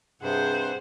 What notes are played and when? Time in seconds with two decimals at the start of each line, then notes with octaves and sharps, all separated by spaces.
0.22 G2 C3 G#4 C5 F#5